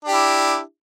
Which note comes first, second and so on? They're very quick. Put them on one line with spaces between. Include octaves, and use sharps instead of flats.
D4 G4 E4